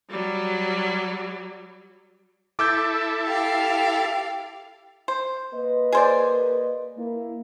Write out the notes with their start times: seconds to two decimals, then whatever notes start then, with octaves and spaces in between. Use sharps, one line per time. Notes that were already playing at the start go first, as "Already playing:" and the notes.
0.10 F#3 G3
2.59 E4 A4 D6 E6 G6
3.25 G4 F5
5.08 C5
5.54 A#3 B4 D#5
5.92 G#4 C5 D5
6.97 A#3 E4